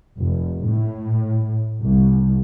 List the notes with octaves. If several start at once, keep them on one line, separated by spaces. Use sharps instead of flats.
F1
A2
C2